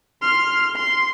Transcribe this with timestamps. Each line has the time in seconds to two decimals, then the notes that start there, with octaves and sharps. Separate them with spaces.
0.22 C6 F6
0.76 C6